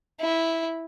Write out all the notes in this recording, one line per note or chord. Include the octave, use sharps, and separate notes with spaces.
E4